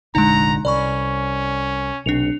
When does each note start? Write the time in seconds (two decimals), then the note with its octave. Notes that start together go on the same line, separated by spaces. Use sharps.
0.15 F1 A#1 D3 G#3 D#4 A#5
0.65 C2 C#4 D5 B5 C#6
2.06 B1 C3 D4 C#7 F7